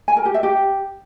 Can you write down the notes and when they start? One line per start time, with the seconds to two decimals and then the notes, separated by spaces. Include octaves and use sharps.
0.08 G#5
0.17 A#4
0.25 G4
0.34 E5
0.43 G4